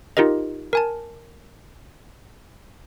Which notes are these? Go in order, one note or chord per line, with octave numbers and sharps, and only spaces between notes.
D#4 F4 G4 A#4 D#5
A#4 G#5 A5